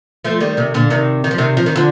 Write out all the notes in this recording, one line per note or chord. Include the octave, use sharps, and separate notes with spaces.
F3 A3
D#3 G3
C3 D#3
A#2 D3
C3 D#3
D#3
F3
C3 D#3
F3
D#3
D3 F3